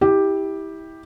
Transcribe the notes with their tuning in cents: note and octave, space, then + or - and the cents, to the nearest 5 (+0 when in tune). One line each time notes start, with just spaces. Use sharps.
E4 -25 G4 +5